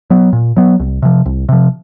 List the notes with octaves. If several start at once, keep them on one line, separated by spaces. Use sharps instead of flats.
F#3 B3
A#2
F#3 B3
C2
C3 F3
C2
C3 F3